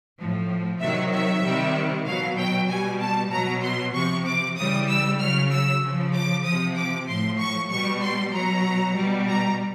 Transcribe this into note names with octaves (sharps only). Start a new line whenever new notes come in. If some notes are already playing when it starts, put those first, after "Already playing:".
A2 F3
C3 D#3 F#3 E5
E5
C3 D#3 G3
B2 F#3 F5
G5
B2 G3 G#5
A5
B2 F#3 A#5
C6
C3 F3 C#6
D6
C#3 E3 G3 D#6
E6
C#3 F#3 F6
E6
C#3 F3
D6
C3 F3 D#6
D6
A2 F3 C6
C#6
B2 G3 C#6
C6
B2 F#3 A#5
B2 G3
A#5